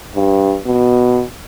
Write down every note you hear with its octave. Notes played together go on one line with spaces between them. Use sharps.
G2
B2